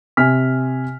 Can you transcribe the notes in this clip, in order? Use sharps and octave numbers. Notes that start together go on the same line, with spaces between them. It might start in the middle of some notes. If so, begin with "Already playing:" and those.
C3 G#5 F6 B6